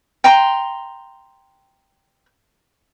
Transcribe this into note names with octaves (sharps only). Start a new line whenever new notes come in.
G5 A#5 C6